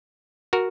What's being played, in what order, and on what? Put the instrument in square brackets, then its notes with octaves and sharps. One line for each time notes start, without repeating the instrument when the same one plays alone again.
[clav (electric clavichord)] F#4 A#4